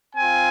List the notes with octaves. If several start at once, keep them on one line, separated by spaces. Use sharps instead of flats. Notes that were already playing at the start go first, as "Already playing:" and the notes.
C4 F4 G#5